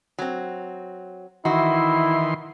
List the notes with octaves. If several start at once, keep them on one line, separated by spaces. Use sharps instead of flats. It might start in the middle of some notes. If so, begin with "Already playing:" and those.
F#3 C4
D#3 E3 E4 F#4 C6